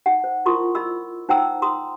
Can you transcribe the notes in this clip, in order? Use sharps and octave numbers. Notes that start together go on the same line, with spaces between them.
D#4 F#5
C5
E4 F4 A#4 C6 C#6 D#6
D#5 B5 E6
D#4 C5 F#5 G5 A#5 E6
A#5 C6 D#6